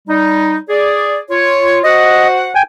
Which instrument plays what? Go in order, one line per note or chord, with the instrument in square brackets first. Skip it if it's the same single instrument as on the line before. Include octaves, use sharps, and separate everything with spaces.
[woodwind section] G3 D#4
G#4 D5
F4 C#5
[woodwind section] F#4 C5 F#5 [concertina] D#5
[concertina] G5 G#5